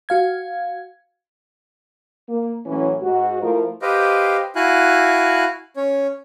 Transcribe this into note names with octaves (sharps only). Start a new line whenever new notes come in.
F#4 F5 G#6
A#3
A2 E3 F#3 C#4
G#2 F#4
F3 A3 E4 F4 A#4
G4 B4 C5 D#5 F5 G5
E4 F#4 F5 G#5 F#6
C#4 C#5